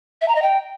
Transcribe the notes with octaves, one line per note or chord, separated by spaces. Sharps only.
E5
A#5
D#5
G5